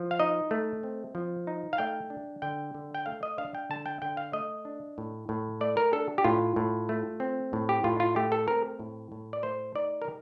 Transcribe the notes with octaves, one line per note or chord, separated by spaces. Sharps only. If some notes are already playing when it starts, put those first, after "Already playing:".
Already playing: F3
F5
D#4 D#5
A3
C4
F3
D#4
F5
A3 G5
D4
D3 G5
D3
G5
A3 F5
D#5
D4 F5
G5
D3 A5
G5
D3 G5
F5
A3 D#5
D4
A2
A2
A3 D5
A#4
D4 A4
G4
A2 F4
A2
A3
C4
A2
G4
A2 F4
F4
A3 G4
A4
C4 A#4
A2
A2
D5
A3 C5
D#4 D5
A#4